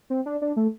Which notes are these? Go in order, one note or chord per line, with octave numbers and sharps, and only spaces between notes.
C4
D4
D4
A3